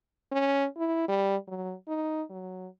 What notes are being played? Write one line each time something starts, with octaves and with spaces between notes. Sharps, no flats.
C#4
E4
G3
F#3
D#4
F#3